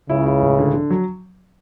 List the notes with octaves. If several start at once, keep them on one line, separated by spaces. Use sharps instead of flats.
C#2 C#3 E4
E4
A2
D3
D3
F#3